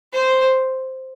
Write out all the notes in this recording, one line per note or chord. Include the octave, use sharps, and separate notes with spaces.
C5